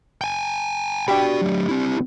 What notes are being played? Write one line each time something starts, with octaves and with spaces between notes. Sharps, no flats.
G5 G#5
D4 F#4 G4 B5
F#3 A3
C4 E4